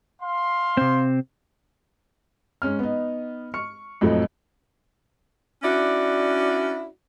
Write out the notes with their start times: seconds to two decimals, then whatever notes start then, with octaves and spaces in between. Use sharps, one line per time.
0.21 F5 C6
0.77 C3 C4
2.62 G#2 C#4 F6
2.79 B3 D#4
3.54 C#6 F6 C#7
4.01 F2 A2 F3 F#3 A3 D#4
5.63 C#4 D4 E4 F#4 D5